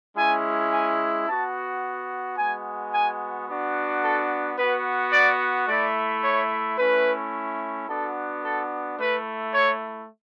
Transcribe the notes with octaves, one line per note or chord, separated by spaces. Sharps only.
G#3 C#4 E4 G#5
G#5
B3 F#4 A5
G#3 B3 F#4 G#5
G#5
B3 D4 F#4
A4
B3 F#4 B4
D5
A3 E4 D5
C#5
A3 C#4 E4 B4
B3 D4 F#4 A4
A4
A3 E4 B4
C#5